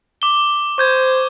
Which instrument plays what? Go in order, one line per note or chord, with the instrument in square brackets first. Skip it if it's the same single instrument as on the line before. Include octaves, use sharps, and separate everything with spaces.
[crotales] D6 G7
[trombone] C5 [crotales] C#6 G6 G#6